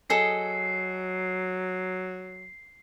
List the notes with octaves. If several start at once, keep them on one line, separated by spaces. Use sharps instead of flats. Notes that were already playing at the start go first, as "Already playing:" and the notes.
F#3 G#4 A4 D#5 C7